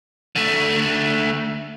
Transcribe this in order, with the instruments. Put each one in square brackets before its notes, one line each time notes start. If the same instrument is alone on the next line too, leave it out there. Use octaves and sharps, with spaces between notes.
[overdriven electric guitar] D3 A3